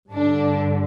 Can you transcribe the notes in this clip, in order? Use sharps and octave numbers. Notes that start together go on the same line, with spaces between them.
G2 D3 D4